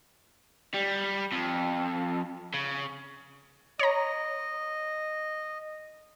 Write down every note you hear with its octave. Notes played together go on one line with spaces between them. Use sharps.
G3
F2
C#3
C#5 D#5 A#5